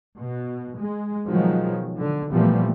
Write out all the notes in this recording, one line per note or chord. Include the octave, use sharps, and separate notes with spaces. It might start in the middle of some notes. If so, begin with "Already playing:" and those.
B2
G#3
B2 D#3 F3 F#3 G#3
D3
A#2 E3 F3 G3 A3 B3